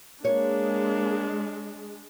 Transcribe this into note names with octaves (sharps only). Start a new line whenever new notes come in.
G#3 A#3 D4 C#5